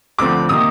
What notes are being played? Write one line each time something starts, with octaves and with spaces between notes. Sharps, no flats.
D2 D3 F3 C4 D6
C3 D#3 A#3 D#6